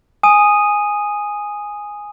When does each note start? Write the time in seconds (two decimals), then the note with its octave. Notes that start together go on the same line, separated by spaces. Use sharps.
0.23 G#5 D#6 D#7